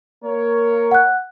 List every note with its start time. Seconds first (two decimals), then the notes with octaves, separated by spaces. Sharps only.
0.25 A#3 A#4 C#5
0.91 F#5 F#6